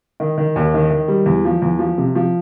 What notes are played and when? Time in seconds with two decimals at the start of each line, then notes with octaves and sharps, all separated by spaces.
0.20 D#3
0.38 D#3
0.56 D#2
0.74 D#3
0.91 D#3
1.08 G3
1.26 E2
1.45 F3
1.62 E2
1.79 F3
1.98 C3
2.15 F3